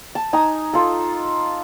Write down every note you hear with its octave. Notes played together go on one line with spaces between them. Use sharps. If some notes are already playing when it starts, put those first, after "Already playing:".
A5
D#4 G#5 A#5 D#6
F4 A4